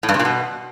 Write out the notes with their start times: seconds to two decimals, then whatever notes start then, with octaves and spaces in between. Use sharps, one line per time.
0.03 A2
0.09 G2
0.14 C3
0.19 A#2
0.25 B2